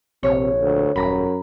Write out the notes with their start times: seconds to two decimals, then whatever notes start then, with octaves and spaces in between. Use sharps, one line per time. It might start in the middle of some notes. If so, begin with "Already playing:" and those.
0.23 A#1 C3 C#5
0.62 D2
0.96 D#1 F#2 A#5 B5